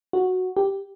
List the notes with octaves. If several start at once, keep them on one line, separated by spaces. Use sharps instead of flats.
F#4
G4